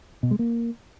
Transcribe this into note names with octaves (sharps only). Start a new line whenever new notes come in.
B2
G#3
A#3